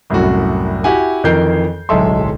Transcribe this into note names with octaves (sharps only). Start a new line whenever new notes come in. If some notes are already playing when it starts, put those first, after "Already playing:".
C2 F#2 A2 F#4
E4 F#4 G4 E5 F#5 G#5
F2 D#3 E3 A#4 G6 C7
D1 B1 G#3 A4 E5 C6